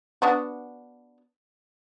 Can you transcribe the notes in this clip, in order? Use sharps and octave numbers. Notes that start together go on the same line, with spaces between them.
B3 D4 F#4